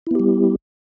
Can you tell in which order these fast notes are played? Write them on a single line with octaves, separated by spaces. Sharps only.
E4 B3 G4 G3